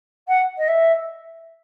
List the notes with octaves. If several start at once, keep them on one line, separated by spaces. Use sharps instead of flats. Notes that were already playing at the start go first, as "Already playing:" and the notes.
F#5
D#5
E5